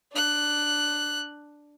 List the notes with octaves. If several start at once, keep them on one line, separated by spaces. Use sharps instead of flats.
D4 F#6